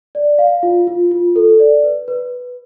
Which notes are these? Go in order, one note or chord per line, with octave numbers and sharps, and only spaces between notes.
D5
F5
F4
F4
F4
A4
D5
B4
B4